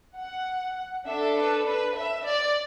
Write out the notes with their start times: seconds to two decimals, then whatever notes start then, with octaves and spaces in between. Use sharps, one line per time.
0.16 F#5
1.06 D4 A4 E5
1.36 B4
1.66 B4
1.96 E5
2.25 D5